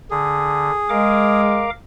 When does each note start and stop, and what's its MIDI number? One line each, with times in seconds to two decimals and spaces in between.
0.11 0.71 50
0.11 1.41 68
0.90 1.67 56
0.90 1.70 70
0.90 1.70 77
0.90 1.70 86